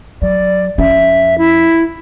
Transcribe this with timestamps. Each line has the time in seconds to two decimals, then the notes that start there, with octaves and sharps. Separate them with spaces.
0.22 F#3 D5
0.78 F2 C#4 E5
1.38 E4